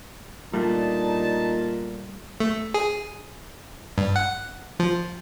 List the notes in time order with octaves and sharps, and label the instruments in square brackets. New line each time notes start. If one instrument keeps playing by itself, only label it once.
[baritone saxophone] A#2 [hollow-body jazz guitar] G3 A3 [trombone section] D4 D#4 [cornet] A5
[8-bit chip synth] A3
G#4
G2
F#5
F3